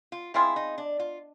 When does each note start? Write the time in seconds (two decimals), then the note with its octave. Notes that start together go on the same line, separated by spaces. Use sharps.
0.12 F4
0.34 G#3 C4 E4 F4 G#4
0.56 D#4
0.78 D4
1.00 F4